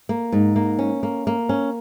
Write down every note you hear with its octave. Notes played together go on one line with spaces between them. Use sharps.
A#3
G#2
A#3
C#4
A#3
A#3
C#4